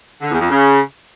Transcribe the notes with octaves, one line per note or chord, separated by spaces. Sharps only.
D3
E2
F2
C#3